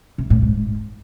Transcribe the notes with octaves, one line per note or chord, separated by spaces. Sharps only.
C3
A2
G#2